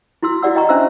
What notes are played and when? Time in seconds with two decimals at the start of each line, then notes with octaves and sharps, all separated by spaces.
0.23 E4 F#4 C6 E6
0.42 E4 F#4 G4 D5 F#5 E6
0.56 D#5 G5 A#5 C#6
0.69 C#4 D4 C5 E5 A#5 E6